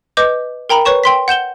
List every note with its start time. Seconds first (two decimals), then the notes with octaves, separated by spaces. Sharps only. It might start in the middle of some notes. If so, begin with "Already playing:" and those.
0.17 B4 D#5 D6 G6
0.69 A#4 G5 A#5 B5
0.85 B4 C#5 C#6 E7
1.04 G5 C6 B6
1.28 F#5 G6 E7 G7